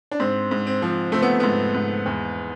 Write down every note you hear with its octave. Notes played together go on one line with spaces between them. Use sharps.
D4
G#2 C4
G#2
C4
F3
A3 C4
B3
G#2 B3
G#2
E2